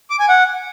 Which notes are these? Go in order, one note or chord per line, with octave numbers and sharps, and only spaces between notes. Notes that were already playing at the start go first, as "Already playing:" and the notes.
D6
G#5
F#5